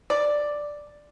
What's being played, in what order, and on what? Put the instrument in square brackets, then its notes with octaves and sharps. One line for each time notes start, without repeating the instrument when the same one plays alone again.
[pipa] D5